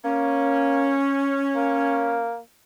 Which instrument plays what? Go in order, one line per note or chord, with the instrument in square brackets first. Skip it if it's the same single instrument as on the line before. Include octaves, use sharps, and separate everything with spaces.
[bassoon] A#3 [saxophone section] C#4
[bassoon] A#3